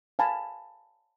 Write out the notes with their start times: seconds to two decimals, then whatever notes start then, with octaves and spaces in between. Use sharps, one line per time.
0.19 F5 G#5 A5 B5